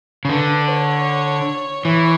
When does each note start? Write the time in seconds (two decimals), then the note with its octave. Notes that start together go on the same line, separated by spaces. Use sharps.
0.25 C#3
0.30 D3 B4
0.69 C#5
1.85 E3 C#5